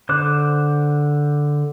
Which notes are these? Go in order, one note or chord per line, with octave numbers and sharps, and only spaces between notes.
D3 C5 D6 F#6